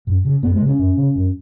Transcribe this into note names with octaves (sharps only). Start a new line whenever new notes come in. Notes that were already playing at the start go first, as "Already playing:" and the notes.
F#2
C#3
F#2 B3
G#3
C#3
C#4
F#2
C#3
F#2